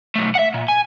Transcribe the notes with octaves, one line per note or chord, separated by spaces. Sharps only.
B1 A3
E5 F#5
A#2
G#5